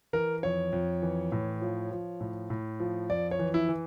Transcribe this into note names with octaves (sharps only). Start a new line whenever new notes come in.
E3 A#4
F2 C#5
F2
E3
A2
F3
F3
A2
A2
F3
F2 D5
C#5
E3
E4
E3